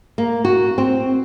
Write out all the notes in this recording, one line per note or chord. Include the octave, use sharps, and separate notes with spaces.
A#3
F#4
C4